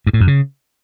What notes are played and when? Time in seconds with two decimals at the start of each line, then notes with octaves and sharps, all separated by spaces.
0.06 G2
0.13 A2
0.20 F#2
0.27 C#3